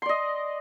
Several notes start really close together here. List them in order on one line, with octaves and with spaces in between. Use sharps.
C6 D5 D#5